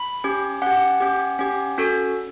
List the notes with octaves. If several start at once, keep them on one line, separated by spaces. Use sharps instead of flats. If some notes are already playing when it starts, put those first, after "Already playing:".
Already playing: B5
C#4 G4
C#4 G4 F#5
C#4 G4
C#4 G4
C#4 F#4 A4